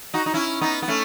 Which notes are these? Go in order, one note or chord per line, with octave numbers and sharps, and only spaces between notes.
D#4 F#4
D#4
C#4 E4
B3 D#4
B3
A3 C#4